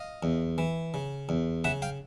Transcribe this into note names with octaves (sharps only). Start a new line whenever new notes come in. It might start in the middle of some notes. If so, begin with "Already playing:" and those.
Already playing: D#5 F5
E2
E3
C#3
E2
C#3 E5 F#5
F5 G5